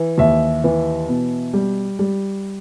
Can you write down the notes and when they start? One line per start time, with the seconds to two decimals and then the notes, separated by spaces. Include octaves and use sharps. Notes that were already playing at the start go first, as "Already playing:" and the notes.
Already playing: E3
0.18 D#2 E5
0.64 E3
1.08 B2
1.54 G3
1.99 G3